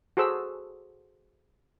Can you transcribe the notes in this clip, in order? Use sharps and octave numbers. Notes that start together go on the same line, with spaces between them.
F#4 G#4 A4 C5 E6